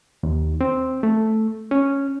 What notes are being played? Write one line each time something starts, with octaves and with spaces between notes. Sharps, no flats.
D#2
C4
A3
C#4